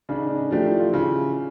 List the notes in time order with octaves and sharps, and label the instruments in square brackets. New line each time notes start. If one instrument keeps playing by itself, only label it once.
[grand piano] C#3 [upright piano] D4
[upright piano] D#4
D4
D#4
[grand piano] F3 A3 D4 G4
[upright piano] E4
F4
[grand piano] C#3 [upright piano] E4